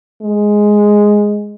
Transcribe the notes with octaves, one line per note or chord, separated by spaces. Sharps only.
G#3